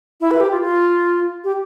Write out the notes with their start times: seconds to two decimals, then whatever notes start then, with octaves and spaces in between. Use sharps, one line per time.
0.21 E4
0.31 B4
0.40 G4
0.51 F4
0.62 F4
1.44 G4